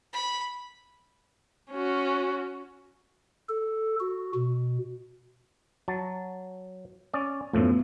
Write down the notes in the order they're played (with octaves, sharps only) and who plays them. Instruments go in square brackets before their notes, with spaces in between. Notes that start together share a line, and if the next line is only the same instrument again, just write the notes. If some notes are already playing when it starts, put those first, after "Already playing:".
[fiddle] B5
[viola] C#4 F#4
[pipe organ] A4
F#4
B2
[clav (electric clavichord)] F#3 A5
C#4 D5
[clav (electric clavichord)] F#2 A2 F3 [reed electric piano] A3 B3